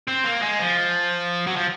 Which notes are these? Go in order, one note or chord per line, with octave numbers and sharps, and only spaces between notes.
C4
A#3
G#3
F3
F#3
F3